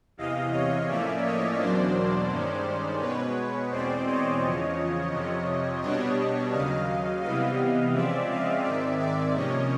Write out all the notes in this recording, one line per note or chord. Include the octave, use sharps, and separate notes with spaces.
E2 C3 E3 D#5 F5
C#5 D#5
A2 F3 A#3 C#4 D5 E5
C#5 D#5
E2 B2 F#3 A#3 D4 C5 D5
G2 D#3 G#3 C#4
B2 G#3 B3 B4 C#5
E2 B2 G#3 C4 C5 D5
C#5 D#5
E2 C#3 F3
F2 C3 F3
B2 G3 B3 D4 C#5 D#5
D#2 C#3 F#3 D#5 F5
C3 E3 G3 B3 D#5 F5
C#3 F3 G#3 C4 D5 E5
D#5 F5
G#2 D#3 G#3 C4 D5 E5
D5 E5
C3 F3 A#3 C#4 C#5 D#5